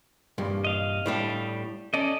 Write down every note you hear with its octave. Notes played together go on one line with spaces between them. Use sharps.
C2 G2 A#2
D#5 F5
A2 G3 D4
C#4 A4 D5 D#5